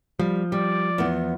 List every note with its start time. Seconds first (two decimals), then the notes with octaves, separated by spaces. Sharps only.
0.19 F3 G3
0.52 G3 D5
0.98 E2 B3